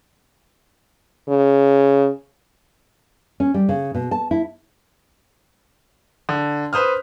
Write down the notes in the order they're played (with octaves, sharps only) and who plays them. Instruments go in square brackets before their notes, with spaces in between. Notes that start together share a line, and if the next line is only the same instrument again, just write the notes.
[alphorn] C#3
[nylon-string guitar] C#4
G3
C#3
B2
A5
E4
[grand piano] D3
B4 C5 D#6 F6